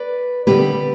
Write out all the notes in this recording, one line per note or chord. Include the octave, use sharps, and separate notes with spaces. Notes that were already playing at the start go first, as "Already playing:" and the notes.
Already playing: B4 D5
D3 G3 B3 G4 B4